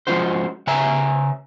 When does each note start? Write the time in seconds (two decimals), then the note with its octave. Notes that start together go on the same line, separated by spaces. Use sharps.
0.07 F3 G#3 C#4 F4 F#4 C5
0.67 C#3 B4 C#5 E5 G#5 A#5